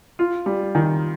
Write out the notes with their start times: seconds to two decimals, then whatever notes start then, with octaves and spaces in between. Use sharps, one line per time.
0.19 F4
0.46 G3
0.75 D#3